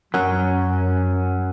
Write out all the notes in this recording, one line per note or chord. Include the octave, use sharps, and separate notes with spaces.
F#2 F#3 C#4 A#4 F#5 G#5